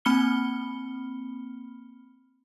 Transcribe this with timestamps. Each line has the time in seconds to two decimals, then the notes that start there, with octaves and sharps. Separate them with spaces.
0.05 A#3 C4 B5 F6 C#7 G7